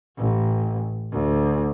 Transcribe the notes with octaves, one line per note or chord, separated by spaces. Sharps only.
A1
D2